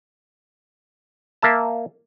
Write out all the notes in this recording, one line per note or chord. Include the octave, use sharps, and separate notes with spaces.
A#3 E5 A5